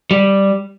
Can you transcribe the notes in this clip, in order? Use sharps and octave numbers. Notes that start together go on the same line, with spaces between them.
G3